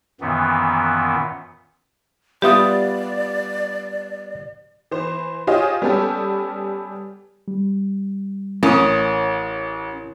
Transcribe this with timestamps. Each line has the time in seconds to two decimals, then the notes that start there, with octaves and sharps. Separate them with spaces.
0.21 F#2 A#2 D#3 E3 B3
2.42 G3 B3 F4 G4 D5 E5 D#6
4.91 E3 C5
5.47 F4 G4 G#4 C5 C#5 D#5
5.82 G3 B3 C#4 G4 A4
7.48 G3
8.63 A1 C#4 E4 A#4 D#6